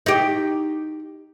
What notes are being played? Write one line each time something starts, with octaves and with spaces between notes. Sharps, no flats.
D#4 G4